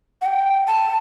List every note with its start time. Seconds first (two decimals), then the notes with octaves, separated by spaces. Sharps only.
0.22 F#5
0.26 G5
0.67 A5